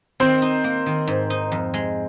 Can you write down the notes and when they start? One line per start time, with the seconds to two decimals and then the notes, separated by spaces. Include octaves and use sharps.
0.20 D#3 C4 C5
0.42 D#4
0.64 A#3
0.86 D#3
1.08 G#2
1.30 D#4
1.52 F2
1.74 G#3